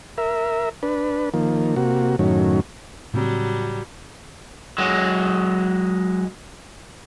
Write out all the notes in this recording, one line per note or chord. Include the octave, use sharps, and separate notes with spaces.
A#4 E5
D4 B4
D#3 F3 A#3
C3 A#3 F#4
F#2 A2 D#3 F#3 C#4
A2 C#3 F#3 G3 C4
F#3 G#3